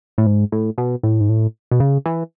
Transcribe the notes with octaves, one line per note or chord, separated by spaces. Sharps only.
A2
G#2
A2
B2
A2
G#2
A2
B2
C#3
E3